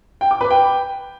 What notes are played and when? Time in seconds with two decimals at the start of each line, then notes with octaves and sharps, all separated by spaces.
0.21 G5
0.31 D6
0.41 B4
0.51 G5